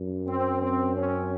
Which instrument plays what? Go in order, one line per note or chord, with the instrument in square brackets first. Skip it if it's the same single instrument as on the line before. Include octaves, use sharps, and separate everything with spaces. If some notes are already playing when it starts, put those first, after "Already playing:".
Already playing: [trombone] F#2
[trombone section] C4
C4
C#4